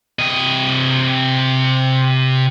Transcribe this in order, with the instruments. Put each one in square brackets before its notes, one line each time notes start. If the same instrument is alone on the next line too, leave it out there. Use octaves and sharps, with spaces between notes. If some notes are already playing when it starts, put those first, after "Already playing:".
[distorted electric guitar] C3 D#5